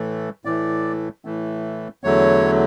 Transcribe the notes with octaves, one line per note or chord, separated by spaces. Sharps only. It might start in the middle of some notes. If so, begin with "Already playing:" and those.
Already playing: A2 E3 A3
A2 E3 A3 D5
A2 E3 A3
E2 D3 F#3 A3 C#5